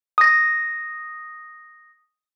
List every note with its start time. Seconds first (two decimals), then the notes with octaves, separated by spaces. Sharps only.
0.18 D#6 A#6